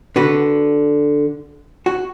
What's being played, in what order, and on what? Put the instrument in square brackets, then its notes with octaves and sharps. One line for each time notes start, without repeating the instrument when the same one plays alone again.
[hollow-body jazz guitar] D3 F#4 B4
F#4